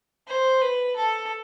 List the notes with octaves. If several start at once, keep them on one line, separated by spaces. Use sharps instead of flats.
C5
B4
A4